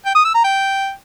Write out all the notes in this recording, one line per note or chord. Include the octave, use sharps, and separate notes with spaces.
G5
D#6
E6
A#5
G5